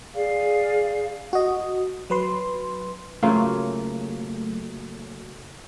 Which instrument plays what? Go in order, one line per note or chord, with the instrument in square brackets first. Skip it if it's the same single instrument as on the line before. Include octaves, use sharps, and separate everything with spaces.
[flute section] G#4 D5 F5
[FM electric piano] F#4 D#5
F#3 B4 C6
[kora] C#3 A#3 F4 [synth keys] F#3 A3